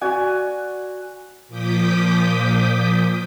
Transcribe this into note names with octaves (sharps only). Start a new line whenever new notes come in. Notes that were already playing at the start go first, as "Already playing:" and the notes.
F#4 D5 G#5
A#2 F3 D6 D#6 G6 B6